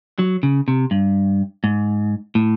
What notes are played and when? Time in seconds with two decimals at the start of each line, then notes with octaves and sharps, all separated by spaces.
0.19 F#3
0.43 C#3
0.68 C3
0.91 G2
1.64 G#2
2.35 A2